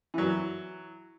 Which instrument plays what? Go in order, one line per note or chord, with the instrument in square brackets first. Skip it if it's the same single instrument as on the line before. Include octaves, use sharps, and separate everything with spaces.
[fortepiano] E3 F#3